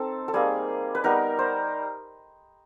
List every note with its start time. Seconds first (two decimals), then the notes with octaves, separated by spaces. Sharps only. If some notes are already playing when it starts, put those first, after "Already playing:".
Already playing: C4 D#4 A4 C5
0.28 A4
0.33 G3 A#3 D#4 G#4
0.95 B4
1.04 G3 B3 D#4 A#4
1.39 C5